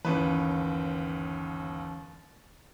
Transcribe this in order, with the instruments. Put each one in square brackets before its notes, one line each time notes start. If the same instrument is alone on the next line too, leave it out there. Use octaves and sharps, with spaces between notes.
[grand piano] G1 D#2 B4 [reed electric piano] E3 C#4